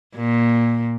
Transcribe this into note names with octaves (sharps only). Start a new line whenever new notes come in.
A#2